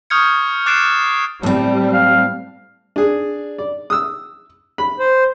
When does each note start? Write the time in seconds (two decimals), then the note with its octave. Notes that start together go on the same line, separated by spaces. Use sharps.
0.10 C#6 D#6 F6 G6 G#6 C#7
0.66 D6 F#6 A6 C7 D7 E7
1.43 A2 G3 C4
1.93 F5
2.96 D4 G#4
3.58 D5
3.90 D#6 E6
4.78 B5
4.99 C5